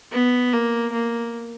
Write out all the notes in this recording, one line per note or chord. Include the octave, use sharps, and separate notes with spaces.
B3
A#3
A#3